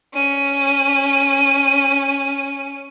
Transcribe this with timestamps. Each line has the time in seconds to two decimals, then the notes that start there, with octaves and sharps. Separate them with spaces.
0.14 C#4 D#7